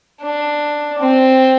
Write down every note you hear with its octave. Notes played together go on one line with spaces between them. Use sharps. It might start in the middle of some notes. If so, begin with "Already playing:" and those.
D4
C4